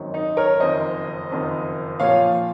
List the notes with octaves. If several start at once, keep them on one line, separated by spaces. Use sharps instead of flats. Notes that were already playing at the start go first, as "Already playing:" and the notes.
Already playing: G#1 F#2 D#3 F#3
D#4
A#4 C#5
F#1 F2 D#3 C5 D#5
F#1 F2 D#3
A#2 F3 C#5 F5